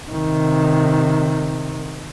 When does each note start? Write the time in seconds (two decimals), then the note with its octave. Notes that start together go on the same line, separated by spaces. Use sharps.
0.10 C3 D#3